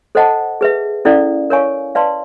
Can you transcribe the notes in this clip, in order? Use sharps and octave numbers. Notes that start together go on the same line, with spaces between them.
A4 C5 D#5 F#5 A5
G#4 B4 E5
C#4 E4 A4 D5 F5
A#4 C#5 F5 G#5 C#6
B4 D5 F5 A5 C6